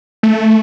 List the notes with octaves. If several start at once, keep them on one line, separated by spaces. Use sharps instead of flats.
A3